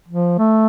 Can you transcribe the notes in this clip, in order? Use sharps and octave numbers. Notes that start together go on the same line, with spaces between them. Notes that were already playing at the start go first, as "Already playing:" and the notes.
F3
A3